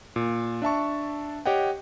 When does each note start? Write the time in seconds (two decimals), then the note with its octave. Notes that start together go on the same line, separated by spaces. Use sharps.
0.16 A#2
0.62 D4 E5 A5 C#6
1.45 G4 C#5 D#5 F#5 G5